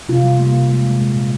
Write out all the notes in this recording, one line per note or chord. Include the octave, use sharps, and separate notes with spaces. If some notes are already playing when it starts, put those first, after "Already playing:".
C3 F4
G3
A#3
C3
G#3
G#3
A#2
A#2